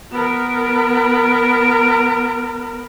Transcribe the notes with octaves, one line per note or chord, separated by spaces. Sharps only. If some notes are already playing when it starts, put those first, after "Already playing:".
B3 A#4